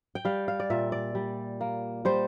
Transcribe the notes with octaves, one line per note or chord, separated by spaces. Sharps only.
G5
G3 F5
F5
D5
A#2 E5
D5
G3
A#3
G3 C5